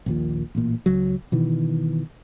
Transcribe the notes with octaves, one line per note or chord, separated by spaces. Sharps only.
A#1 D#2 A#2
A1 A#2
C#2 F#3
B2 D#3 E3